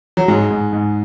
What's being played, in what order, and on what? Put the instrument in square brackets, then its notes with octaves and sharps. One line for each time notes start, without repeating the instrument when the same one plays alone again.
[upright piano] F#3
[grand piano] G#2 [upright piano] G#3
[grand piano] G#2
G#2